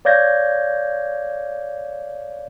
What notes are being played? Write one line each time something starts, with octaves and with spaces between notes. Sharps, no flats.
C#5 D5 F5 G6 G#6 A#6